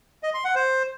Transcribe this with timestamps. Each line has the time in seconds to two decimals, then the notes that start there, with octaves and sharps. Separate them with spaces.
0.23 D#5
0.34 C6
0.45 F#5
0.55 C5